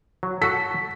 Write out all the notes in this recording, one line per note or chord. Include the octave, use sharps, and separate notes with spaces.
F#3
F#4 A4 B6